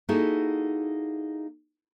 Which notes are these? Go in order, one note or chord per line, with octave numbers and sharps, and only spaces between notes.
A#3 D#4 E4 F#4 G#4 A4